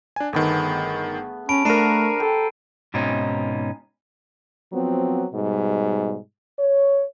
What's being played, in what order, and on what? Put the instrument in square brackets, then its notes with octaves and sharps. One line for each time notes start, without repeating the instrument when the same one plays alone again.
[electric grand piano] D4 G#5
[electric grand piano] G1 D#3 [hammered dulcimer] A3 B3 G#4
[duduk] C#4 [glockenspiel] A5 B5 D7
[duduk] A3 [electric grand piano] D4 A#4 [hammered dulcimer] F#4 C5 [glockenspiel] A#5 C7 D#7
[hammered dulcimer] G4 [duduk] A4
[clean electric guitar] G#2 B2 C4 C#4 D#4
[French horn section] F3 F#3 B3 C4
G#2 B2 G3
C#5